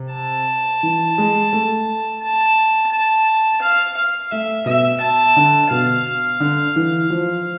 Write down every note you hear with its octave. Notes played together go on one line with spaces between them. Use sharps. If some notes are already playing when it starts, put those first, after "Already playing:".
Already playing: C3
A5
E3
G#3
A3
A5
A5
F5
F5
A3 E5
B2 E5
A5
D3
B2 F5
D3
E3
F3